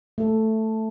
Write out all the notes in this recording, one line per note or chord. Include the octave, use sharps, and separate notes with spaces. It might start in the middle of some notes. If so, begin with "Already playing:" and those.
A3 A4